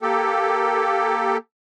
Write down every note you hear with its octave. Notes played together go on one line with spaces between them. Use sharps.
A#3 G4 A4